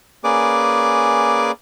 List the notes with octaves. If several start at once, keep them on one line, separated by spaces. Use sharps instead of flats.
A#3 C#4 G#4 B4 D5 D6